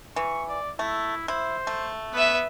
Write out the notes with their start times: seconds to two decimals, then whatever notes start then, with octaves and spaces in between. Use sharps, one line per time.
0.16 E3 C#6
0.48 D5
0.79 A3 E4
1.28 E4 C5
1.67 A3
2.13 B3 B4 E5